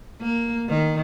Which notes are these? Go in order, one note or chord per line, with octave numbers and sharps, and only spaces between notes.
A#3
D#3